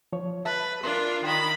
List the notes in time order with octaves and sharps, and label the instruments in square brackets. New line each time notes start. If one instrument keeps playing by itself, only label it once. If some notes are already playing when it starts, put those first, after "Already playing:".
[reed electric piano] F3 C#5
[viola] B4 [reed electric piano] E5 A5
[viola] D4 F4 [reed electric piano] A#4 C6
[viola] D#3 B5 [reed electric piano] G5